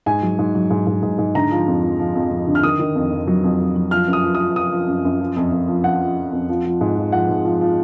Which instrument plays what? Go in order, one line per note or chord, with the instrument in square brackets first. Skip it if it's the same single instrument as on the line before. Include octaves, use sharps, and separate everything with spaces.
[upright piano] G#2 G#5
F#3
G#2
F#3
G#2
G#2
G#2
G#2
D3 A#5
F3
F2
F3
F3
F2
F2
D3
F6
D#3 D#6
D#3
F2
F2
F#3
F2
F2
F#3
F3 F6
F#2
D#6
F3
D#6
F3
F3 D#6
F3
F#2
F#2
F3
F2
F2
F3
F3 F#5
F3
F3
F2
F3
F3
G#2
F3
F3 F#5
G#2
F3
F3